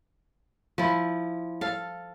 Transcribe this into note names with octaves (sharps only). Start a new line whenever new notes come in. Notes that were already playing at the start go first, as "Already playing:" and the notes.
F3 E4
A4 F5